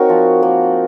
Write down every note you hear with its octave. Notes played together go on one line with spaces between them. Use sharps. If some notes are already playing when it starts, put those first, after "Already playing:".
Already playing: C4 D#4 F#4 A#4 C#5
F3
A#3